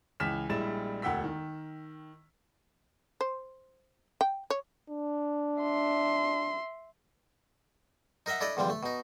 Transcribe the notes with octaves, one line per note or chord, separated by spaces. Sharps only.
C#2 E3 F6 B6 E7
A#1 G3 G#3 E4 A6 E7
E1 D2 F#5 G5 E6 B6
D#3
C5
G5
C#5
D4
E5 C6
D#4 A#4 D#5 E5 F#5
D4 E4 A4 D5 D#5
E2 D3 F3 G3
A3
B2 D#4